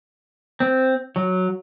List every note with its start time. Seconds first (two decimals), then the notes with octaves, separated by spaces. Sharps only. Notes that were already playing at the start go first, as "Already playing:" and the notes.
0.60 C4
1.16 F#3